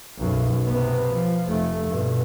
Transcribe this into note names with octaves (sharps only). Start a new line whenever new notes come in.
B1 F#2
C3 B3
F3
F1 A3
G2 B2